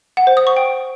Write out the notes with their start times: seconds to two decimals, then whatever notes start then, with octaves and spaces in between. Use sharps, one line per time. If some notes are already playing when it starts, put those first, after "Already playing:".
0.17 F#5
0.27 C5
0.37 D#6
0.47 C#6
0.57 G5